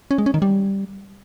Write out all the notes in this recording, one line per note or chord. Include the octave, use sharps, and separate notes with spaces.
C#4
G#3
C#4
D#3
G3